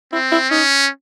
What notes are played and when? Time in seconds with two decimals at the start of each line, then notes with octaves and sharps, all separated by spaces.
0.13 C4 E4
0.32 E4
0.50 C#4 D#4